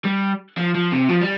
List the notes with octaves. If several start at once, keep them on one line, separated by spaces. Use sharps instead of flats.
G3
F3
F3
C3
F3
G3